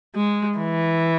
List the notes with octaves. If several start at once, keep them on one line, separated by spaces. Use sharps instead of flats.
G#3
E3